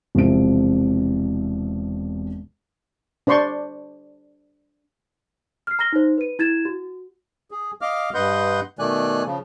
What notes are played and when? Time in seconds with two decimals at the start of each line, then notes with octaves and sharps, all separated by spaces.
0.15 E1 C3 F3 C4 E4 D7
3.27 D4 C5 D5 C6 C#6
5.67 F6 C7
5.79 A#5 F6 A#6 G7
5.93 D#4 C5
6.18 B4 D#7
6.39 E4 G#6 A6 E7
6.65 F#4
7.51 G#4
7.81 D#5 F5 D6 F6
8.14 G2 B4 D#5 F#5 C6 G6
8.79 B2 D#3 A3 D5 G#5 F#6
9.25 C#3 F3